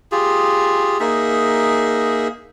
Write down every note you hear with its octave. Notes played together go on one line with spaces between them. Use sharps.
F4 G4 G#4
A#3 D#4 G#4 E5